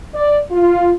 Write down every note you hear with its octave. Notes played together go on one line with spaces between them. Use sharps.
D5
F4